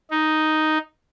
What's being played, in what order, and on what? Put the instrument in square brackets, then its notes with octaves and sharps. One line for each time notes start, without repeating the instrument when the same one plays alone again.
[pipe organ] D#4